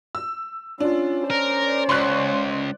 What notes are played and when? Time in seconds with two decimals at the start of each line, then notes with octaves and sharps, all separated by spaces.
0.15 E6
0.80 C#4 D4 F4
1.30 A#4 C5 D5
1.89 C#2 C6 C#6 F#6